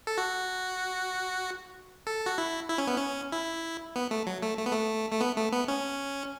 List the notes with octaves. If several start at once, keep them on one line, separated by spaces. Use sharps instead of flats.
A4
F#4
A4
F#4
E4
E4
C#4
B3
C#4
E4
B3
A3
F#3
A3
A3
B3
A3
A3
B3
A3
B3
C#4